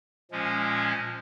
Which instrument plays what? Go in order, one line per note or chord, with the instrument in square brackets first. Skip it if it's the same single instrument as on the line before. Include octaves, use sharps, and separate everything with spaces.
[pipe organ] A#2 F3 G#3 C#4